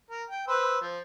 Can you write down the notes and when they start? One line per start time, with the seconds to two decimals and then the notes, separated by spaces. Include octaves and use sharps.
0.11 A#4
0.30 G5
0.48 B4 C5 E6
0.81 F3